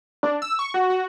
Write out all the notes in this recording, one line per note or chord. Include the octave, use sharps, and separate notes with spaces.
D4
E6
C#6
F#4
F#4